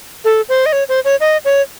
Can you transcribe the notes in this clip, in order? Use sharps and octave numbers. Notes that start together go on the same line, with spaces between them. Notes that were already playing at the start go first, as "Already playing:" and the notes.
A4
C5
D#5
C#5
C5
C#5
D#5
C#5